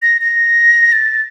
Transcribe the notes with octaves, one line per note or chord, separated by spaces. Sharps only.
A#6
A#6
A6